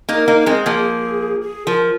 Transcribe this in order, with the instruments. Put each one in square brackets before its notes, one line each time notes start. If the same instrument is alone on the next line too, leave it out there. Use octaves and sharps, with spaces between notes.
[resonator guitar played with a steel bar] A#3 D#4
[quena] A#4
[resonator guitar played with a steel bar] A#3 D#4
[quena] A#4
[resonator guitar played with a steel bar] G#3 C4
[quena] G#4
[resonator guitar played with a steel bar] F3 A#3
[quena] G#4
G#4
[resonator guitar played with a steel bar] F3 [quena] A#4